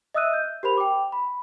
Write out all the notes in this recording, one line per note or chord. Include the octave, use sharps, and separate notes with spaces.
D#5 E5 D#6 E6 F#6 D#7
G6
G4 A#4 C5 B5 F7
G5 D6
B5